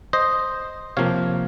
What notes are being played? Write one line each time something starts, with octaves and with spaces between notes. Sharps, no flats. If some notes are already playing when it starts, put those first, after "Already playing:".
C5 D#5
C3 F3 A#3 C#5 F5